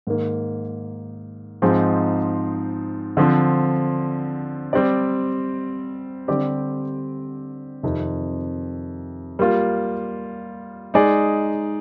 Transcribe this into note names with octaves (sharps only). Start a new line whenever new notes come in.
G#2 D#3 A#3
G#2 F3 C4 D#4 G#4
D3 F3 C4
G3 C4 G4 D5
D3 G3 C4 G4 D5
F2 C3 D#3
G3 A#3 F4
G#3 D#4 G#4 D5